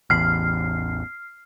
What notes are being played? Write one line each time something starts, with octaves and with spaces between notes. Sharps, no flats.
A1 E2 F6 C7